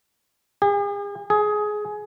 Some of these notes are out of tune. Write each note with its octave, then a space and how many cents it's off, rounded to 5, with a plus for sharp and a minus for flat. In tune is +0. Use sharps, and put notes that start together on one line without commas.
G#4 -45
G#4 +15